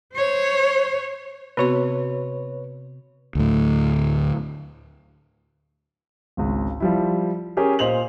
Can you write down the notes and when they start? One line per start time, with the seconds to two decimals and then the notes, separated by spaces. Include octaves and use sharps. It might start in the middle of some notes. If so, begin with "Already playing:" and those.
0.14 C5 C#5
1.57 C3 B3 C4 F#4 B4 C#5 C6
3.35 D2 A2
6.37 G#1 C#2
6.80 F3 G3 E4
7.57 C#4 G4 G#4 A#4
7.79 A#2 C5 D#5 F7 F#7